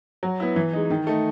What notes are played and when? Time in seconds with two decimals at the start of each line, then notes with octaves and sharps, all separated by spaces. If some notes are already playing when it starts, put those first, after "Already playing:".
0.23 F#3
0.40 B3 E4
0.56 E3
0.73 G#3 D#4
0.90 D#3
1.07 A3 D#4